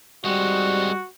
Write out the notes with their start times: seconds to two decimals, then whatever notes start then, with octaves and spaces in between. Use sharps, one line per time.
0.25 G3 G#3 C4 F#4